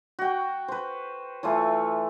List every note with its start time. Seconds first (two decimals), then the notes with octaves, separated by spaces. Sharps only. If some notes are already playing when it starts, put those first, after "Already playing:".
0.19 F#4 G5
0.68 B4 C5
1.43 E3 A3 F4 C#5